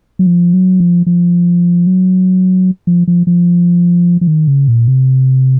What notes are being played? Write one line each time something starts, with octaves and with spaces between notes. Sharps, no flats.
F#3
F3
F#3
F3
F3
F#3
F3
F3
F3
F3
D#3
C#3
A#2
C3